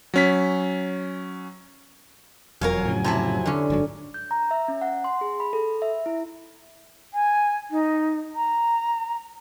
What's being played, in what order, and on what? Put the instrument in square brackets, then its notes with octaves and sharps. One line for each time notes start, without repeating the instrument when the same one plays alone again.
[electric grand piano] F#3 C#4 B6
[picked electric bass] E1 [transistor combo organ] F2 F#3 G#5 [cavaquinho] A#4 C#5 F5
[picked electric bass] A2 C#3
[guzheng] C3 [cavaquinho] E4 A5 A#5
[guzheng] D3 C#4
[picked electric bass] G1 G#2 F#3
[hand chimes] G6
A#5
E5
C#4
F#5
C6
G#4
B5
A4
E5
E4
[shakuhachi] G#5
D#4
A#5